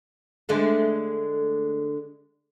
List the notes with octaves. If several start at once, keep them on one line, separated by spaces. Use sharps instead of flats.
D3 G#3 A3